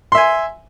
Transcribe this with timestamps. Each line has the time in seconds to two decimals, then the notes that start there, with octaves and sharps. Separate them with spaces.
0.12 C6
0.15 E5
0.18 G#5